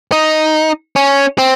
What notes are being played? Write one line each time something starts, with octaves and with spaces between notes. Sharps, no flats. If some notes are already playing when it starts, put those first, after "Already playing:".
D#4
C#4
C4